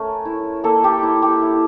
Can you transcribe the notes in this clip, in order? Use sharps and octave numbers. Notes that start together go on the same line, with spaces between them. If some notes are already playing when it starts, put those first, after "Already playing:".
Already playing: A3 C#4 A#4
E4
A#3 A4
G4
E4
G4
E4